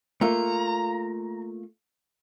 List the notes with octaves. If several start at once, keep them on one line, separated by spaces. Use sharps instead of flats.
A3 A#3 F4 A#5